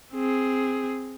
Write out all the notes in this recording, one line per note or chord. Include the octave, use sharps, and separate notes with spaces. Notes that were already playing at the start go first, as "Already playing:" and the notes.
C4 G#4